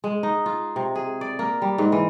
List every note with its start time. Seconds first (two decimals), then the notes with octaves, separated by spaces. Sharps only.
0.04 G#3
0.23 D#4
0.46 F4
0.76 C3
0.95 G#4
1.21 D5
1.39 A#3
1.62 G3
1.78 G#2
1.92 E3